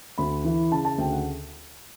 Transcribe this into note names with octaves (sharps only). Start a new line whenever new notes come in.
D2 B5
E3
C#3 A5
A5
D2 G5
F#5